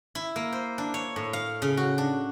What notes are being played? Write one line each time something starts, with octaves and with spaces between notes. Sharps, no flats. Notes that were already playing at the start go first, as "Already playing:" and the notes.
E4
A#3
C5
D4
C#5
A2
F5
C#3
F#4
D4